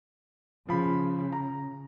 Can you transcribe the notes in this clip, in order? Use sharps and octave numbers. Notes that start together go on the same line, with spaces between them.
C#3 F3 B5
A#5